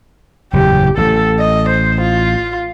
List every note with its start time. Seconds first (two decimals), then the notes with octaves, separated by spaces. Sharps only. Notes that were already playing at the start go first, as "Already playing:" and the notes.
0.53 F#1 E2 A#2 G4
0.97 A1 A4
1.39 D#5
1.69 C5
2.02 F4